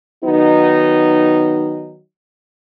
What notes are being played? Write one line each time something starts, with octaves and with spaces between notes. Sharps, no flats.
D#3 F#3 B3 D#4